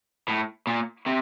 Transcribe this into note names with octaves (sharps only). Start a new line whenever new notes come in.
A2
A#2
C3